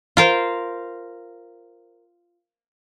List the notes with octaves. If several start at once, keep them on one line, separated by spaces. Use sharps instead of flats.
F4 A#4 C5